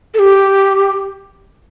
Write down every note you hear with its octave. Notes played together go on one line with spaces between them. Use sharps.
A4
G4